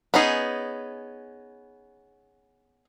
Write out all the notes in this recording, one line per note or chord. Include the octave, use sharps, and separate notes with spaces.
B3 C#4 D#4 G#4